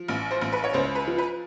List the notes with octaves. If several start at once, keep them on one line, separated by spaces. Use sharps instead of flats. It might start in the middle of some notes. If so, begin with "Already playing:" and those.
Already playing: F3
A1
C5
A1
B4
C#5
C#2 C5
B4
F3
B4